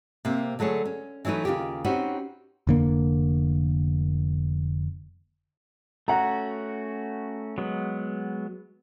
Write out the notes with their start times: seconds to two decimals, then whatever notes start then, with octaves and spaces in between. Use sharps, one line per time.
0.25 C3 A#3 C4
0.59 D3 F#3 A3 G#4 C#5
0.85 C#4
1.25 E3 F#3 A3 D#4 B4
1.45 D#2 C#3 F4 G4
1.84 C4 C#4 D#4 F#4 G4 B4
2.67 F1 D3 A#3
6.08 A3 C#4 F#4 F#5 A#5
7.58 F#3 G#3 B3